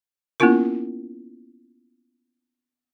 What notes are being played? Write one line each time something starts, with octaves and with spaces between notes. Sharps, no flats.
A#3 B3 C#4 E4 F4 A#4